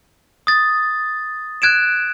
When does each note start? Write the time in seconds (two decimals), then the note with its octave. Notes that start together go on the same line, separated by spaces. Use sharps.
0.47 D#6 A6
1.62 F#6 G#6 D7 E7